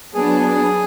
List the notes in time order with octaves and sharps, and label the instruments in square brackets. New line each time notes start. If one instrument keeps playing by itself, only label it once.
[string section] F#3 B3 D4 [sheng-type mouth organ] G#4